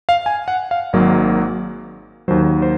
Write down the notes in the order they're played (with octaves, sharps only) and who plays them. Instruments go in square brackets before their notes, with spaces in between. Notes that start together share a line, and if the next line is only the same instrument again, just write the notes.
[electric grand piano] F5
G#5
F#5
F5
G#1 G#2 F#3 A#3
D#2 D#3 F#3 C5
C5